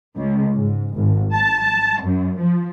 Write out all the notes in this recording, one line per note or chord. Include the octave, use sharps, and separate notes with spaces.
C#2
G#2
G#1
A5
A5
F#2
F3